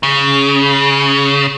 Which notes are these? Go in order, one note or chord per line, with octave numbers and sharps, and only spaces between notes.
C#3